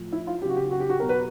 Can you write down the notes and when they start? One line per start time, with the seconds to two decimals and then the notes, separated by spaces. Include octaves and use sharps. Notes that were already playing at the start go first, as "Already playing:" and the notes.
Already playing: A2 F3
0.12 E4
0.27 F4
0.42 C#3 F#3 G4
0.49 F#4
0.56 G4
0.71 F#4
0.80 G4
0.90 F#4
1.00 B2 F#3 A#4
1.09 B4